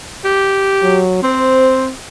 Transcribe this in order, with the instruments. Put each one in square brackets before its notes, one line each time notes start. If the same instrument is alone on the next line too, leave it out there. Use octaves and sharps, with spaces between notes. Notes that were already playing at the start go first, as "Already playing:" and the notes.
[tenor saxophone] G4
[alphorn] F#3
[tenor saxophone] C4 [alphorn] C5